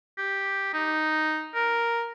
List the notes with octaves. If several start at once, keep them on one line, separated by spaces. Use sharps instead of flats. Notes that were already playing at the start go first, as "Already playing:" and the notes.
G4
D#4
A#4